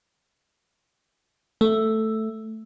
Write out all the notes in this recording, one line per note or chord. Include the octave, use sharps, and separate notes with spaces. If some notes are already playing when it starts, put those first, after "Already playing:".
A3